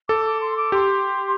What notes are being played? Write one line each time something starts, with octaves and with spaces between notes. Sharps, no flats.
A4 D6
D6
C6
D6
G4 C6